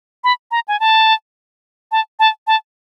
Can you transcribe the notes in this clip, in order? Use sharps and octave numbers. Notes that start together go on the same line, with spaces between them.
B5
A#5
G#5
A5
A5
A5
A5